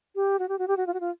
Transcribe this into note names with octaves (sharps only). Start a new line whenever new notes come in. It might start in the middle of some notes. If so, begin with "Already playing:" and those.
G4
F#4
G4
F#4
G4
F#4
F4
F#4
F4